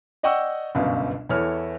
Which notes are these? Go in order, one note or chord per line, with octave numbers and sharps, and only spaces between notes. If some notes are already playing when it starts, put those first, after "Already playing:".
D5 D#5 F#5 G5 C#6 E6
G1 C#2 F#2 B2 F5
E2 E3 E4 A4 C#5 F6